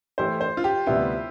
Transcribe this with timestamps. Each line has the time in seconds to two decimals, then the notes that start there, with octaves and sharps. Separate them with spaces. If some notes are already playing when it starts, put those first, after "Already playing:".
0.18 E3 A3 E4 G4 C5
0.41 C5
0.57 F4
0.64 G4
0.87 D2 C3 G3 B3 E4